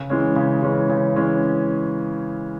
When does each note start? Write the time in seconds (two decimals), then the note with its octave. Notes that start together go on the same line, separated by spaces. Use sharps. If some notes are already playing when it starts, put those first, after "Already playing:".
Already playing: C#3
0.10 E3 G#3 C#4
0.36 C#3
0.63 E3 G#3 C#4
0.89 C#3
1.16 E3 G#3 C#4